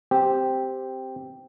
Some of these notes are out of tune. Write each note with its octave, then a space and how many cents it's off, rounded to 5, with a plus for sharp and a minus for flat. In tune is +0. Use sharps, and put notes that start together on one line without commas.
C4 +0 G4 +0